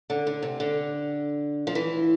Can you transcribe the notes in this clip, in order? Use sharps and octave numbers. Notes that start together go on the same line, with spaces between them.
D3
D3
C3
D3
F3
E3